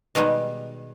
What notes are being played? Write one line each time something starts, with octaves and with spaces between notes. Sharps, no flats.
B2 D#3 G3 G#3 B3